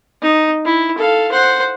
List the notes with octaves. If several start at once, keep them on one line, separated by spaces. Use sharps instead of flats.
D#4
E4
A4 F5
C5 F#5